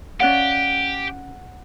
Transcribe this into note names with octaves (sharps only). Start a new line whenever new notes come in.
C#4 G4 D5 F5 F#5 F#6